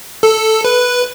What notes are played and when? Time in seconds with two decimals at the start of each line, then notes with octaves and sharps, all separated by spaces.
0.23 A4
0.65 B4